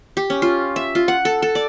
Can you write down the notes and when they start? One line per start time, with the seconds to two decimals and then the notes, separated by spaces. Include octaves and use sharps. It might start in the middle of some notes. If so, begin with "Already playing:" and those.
0.17 G4
0.30 C#4
0.42 F4
0.76 E5
0.95 F4
1.08 F#5
1.25 A4
1.42 A4
1.55 D5